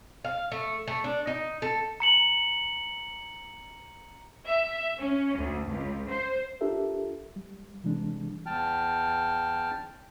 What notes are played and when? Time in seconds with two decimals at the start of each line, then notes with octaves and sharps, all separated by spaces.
0.25 F5
0.52 A3
0.87 A3
1.04 D4
1.27 D#4
1.62 A4
2.00 A#5 C#7 F#7
4.46 E5
4.99 C#4
5.37 D2
5.69 C#2
6.09 C5
6.61 D4 F4 G4 A4 A#4 E5
7.36 G3
7.84 C3 E3 G3 G#3 D4
8.46 E2 G5 A5 F6